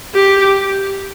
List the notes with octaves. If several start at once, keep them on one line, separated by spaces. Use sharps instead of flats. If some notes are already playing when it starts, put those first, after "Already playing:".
G4